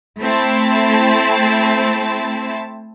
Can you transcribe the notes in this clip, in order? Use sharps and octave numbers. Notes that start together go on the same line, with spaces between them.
A3 C4 E4 A5